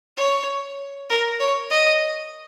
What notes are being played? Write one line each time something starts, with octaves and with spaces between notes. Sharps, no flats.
C#5
A#4
C#5
D#5